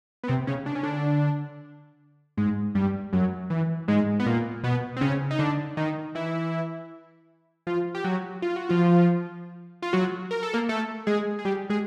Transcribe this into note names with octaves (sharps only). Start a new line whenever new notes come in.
B3
C3 C4
C#3 C#4
D4
C#4
D3 D4
G#2 G#3
G2 G3
F#2 F#3
E3
G#2 G#3
B3
A#2 A#3
B2 B3
C4
C#3 C#4
D#4
D3 D4
D#3 D#4
E3 E4
F3 F4
G4
F#3 F#4
F4
F#4
F3 F4
F4
F#3 F#4
A#4
A4
A#3 A#4
A3 A4
G#3 G#4
G#4
G3 G4
G#3 G#4